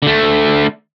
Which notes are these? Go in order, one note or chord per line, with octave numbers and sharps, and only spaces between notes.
D3 A3